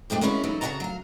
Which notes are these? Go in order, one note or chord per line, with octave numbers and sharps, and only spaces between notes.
F2 G#2 G#3 A3 G4
G#3 A#3 B3 C#4 E4 F#4
E3 F#3 D#4 E4 A4
C#3 F#4 D5 F#5 A5 A#5
F#3 F5